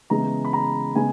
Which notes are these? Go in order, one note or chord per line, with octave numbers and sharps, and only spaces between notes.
C#3 E3 G#3 B3 A#5
B5
A#5
C#3 G#3 B3 G#5